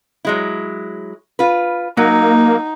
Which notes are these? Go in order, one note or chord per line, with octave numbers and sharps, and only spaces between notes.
F#3 G#3 E4
F4 B4
F#3 A#3 D#4